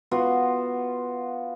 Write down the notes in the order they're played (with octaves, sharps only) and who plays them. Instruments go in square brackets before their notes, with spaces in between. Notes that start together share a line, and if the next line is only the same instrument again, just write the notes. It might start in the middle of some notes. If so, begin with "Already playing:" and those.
[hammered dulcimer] B3 F4 F#4